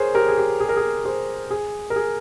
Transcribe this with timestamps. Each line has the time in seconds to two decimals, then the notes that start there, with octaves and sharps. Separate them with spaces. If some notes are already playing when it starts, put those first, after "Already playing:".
Already playing: G#4 A#4 C5 C#5
0.15 G4 A#4
0.28 G#4
0.38 G4
0.60 G#4
0.69 A#4
0.77 G#4
1.05 G#4 C5
1.51 G#4
1.90 A#4
1.96 G#4